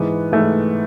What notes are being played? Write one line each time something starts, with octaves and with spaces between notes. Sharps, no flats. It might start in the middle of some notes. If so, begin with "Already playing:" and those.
Already playing: G#2 E3 B3
G#2 E3 A3